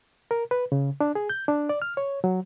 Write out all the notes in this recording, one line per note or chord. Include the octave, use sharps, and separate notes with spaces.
A#4
B4
C#3
D4
G#4
G6
D4
D5
F6
C#5
F#3